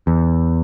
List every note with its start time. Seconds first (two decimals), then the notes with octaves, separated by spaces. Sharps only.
0.07 E2